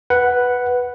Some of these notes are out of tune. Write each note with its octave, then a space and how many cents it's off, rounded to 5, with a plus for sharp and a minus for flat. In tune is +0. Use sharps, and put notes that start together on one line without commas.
B4 +0 F#5 +0